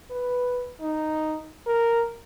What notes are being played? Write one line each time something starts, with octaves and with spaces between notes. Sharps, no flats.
B4
D#4
A#4